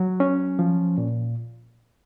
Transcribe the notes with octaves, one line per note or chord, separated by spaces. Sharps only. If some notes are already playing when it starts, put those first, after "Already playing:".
Already playing: F#3
C#4
F3
A#2